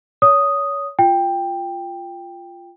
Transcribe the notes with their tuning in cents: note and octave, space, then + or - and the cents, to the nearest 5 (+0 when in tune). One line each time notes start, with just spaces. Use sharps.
C#5 +25 D#6 +0
F4 -5 G5 +10